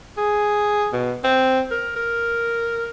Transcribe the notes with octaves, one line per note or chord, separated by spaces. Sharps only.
G#4
B2
C4
A#4
A#4